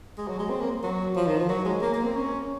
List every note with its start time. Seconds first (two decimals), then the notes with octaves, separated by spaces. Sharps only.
0.18 G#3
0.28 F#3
0.39 G#3
0.49 C4
0.61 A#3
0.83 F#3
1.16 F3
1.27 D#3
1.38 F3
1.49 F#3
1.65 G#3
1.81 A#3
1.93 A#3
2.04 C4
2.15 C#4